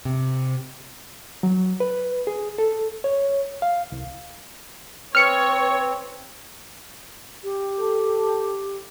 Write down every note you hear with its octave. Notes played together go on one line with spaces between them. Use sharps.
C3
F#3
B4
G#4
A4
C#5
F5
C2
C4 B4 C#5 F6 C#7
G4
A4